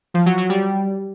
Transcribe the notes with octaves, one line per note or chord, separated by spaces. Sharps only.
F3
F#3
F#3
G3